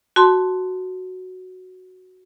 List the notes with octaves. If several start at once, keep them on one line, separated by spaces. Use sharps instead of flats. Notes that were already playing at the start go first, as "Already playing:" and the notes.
F#4 A5 C6